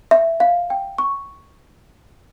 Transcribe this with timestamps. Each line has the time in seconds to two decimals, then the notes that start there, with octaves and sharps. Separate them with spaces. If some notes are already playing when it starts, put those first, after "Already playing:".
0.11 E5
0.40 F5
0.70 G5
0.98 C#6